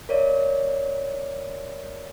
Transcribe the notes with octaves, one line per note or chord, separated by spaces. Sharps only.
A#4 C#5 D5 E5